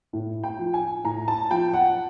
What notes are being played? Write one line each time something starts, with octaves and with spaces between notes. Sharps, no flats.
A2
G5
F3
G#5
A2 A#5
A5
F3 G5
F#5